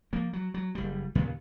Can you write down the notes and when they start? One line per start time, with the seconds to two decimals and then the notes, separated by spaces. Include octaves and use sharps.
0.13 F3 A#3
0.33 F#3
0.54 F#3
0.75 F#1 G3
1.15 D#2 A#2 C#3 B3